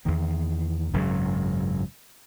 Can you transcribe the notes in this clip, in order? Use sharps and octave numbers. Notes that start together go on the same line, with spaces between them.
E2 D#3 A#3
G#1 F#2 C#3 F#3